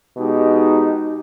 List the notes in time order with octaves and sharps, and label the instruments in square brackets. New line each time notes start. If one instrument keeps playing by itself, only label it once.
[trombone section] B2 G#3 D#4 G4